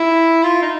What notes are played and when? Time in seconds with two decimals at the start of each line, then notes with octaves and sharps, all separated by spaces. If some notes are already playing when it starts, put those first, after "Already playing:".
Already playing: E4
0.44 F4
0.62 D#4